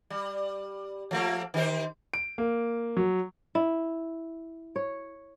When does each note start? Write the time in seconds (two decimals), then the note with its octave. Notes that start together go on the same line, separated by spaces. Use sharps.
0.10 G3
1.11 F3 A3 A#3
1.54 D#3 G4 C5
2.14 D7
2.38 A#3
2.97 F#3
3.55 E4
4.76 C#5